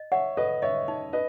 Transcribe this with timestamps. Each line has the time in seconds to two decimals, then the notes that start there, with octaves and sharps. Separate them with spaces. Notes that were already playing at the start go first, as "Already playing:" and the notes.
Already playing: D#5
0.12 C#5 E5 F#5
0.37 A4 B4 D#5
0.62 C#5 D#5 E5
0.88 D#4
1.13 B4 D#5